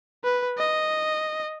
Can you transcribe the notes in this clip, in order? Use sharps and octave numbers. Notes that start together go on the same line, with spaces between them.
B4
D#5